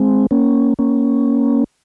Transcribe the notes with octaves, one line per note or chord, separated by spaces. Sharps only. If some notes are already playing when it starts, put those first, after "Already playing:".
Already playing: G#3 C4
A#3 C#4
A#3 C#4